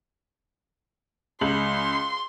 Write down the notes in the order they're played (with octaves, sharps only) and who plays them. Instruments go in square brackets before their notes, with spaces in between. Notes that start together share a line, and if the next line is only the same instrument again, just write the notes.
[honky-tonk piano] C#2 F#7 [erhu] C6